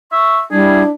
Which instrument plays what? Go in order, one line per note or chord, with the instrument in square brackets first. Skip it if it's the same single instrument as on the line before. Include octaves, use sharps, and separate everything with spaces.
[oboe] E5 [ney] C#6
[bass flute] G3 [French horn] D4 [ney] E4 [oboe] G#4